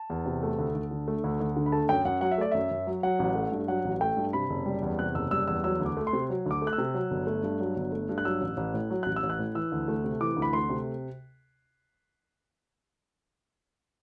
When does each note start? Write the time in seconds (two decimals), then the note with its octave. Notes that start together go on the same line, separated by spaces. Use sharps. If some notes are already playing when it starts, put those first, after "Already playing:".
Already playing: A5
0.10 E2
0.26 C3
0.43 A3
0.59 D2
0.75 D2
0.91 D3
1.08 A3
1.24 D2
1.40 D2
1.57 D3
1.66 B5
1.72 A3 A5
1.89 F#2 G5
2.05 F#2 F#5
2.21 F#3 F#5
2.31 E5
2.38 A3 D5
2.51 F#2 E5
2.71 F#2
2.87 F#3
3.03 F#3 F#5
3.19 A1
3.35 A3
3.52 G2
3.68 F#3 F#5
3.85 A1
4.01 A3 G5
4.17 G2
4.33 C3 B5
4.50 F#1
4.66 G3
4.82 E2
4.99 C3 F#6
5.15 F#1 E6
5.31 G3 E6
5.47 E2 E6
5.64 F#3 E6
5.80 D2
5.86 D6
5.97 A3
6.07 C6
6.13 C3
6.30 F#3
6.46 D2 D6
6.62 A3
6.67 F#6
6.73 E6
6.78 C3
6.94 F#3
7.11 G1
7.27 A3
7.43 G2
7.60 F#3
7.76 G1
7.92 A3
8.09 G2
8.18 F#6
8.25 F#3 E6
8.41 A1
8.57 A1
8.74 A2
8.90 F#3
9.03 A1 F#6
9.16 E6
9.23 A1
9.30 F#6
9.39 A2
9.55 E3 E6
9.72 D2
9.88 A3
10.04 C3
10.20 E3 D6
10.37 D2
10.42 B5
10.53 A3 C6
10.69 C3